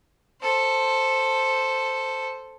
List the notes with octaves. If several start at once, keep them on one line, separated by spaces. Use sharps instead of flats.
A4 C5